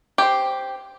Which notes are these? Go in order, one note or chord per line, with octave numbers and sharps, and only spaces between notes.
G4 C5